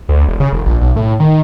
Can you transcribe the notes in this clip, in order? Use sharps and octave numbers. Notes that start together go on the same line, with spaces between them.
D2
E1
C#3
E1
A#1
B1
A2
D#3